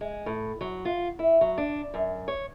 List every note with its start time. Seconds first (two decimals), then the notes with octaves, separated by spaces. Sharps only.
0.01 G#3
0.26 A2
0.61 F#3
0.85 F4
1.19 E4
1.41 F#3
1.58 D4
1.94 F#2
2.28 C#5